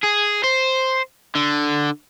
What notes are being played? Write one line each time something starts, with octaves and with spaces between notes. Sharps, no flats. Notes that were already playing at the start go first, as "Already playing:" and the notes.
G#4
C5
D3